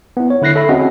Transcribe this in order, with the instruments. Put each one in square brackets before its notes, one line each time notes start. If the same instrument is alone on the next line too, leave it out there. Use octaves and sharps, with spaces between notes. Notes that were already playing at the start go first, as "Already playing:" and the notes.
[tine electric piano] B3 E4
C#5
D3 E4 F#6 A#6 C7
A4 E5 B5
C4 C#4 F#4 G#4 D#5 F#5